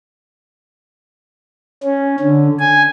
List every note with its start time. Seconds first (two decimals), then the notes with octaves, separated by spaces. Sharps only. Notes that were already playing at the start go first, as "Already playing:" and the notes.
1.83 C#4
2.20 D3
2.59 G#5